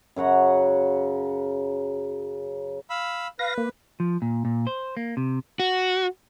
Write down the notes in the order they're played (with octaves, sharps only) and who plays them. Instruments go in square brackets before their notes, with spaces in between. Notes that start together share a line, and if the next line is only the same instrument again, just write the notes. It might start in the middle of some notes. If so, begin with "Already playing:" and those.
[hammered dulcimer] F#2 C#3 F#5 A#5
[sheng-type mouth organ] F5 B5 E6
[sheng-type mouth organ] B4 [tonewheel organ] F5 A#6
[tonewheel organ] A#3
[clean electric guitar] F3
A#2
A#2
C5
A#3
C3
[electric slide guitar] F#4